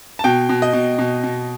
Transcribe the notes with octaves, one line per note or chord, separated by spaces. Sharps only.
A5
B2 G5
B2
D#5
B2
B2
B2